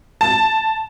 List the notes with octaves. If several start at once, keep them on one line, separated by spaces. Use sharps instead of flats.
A5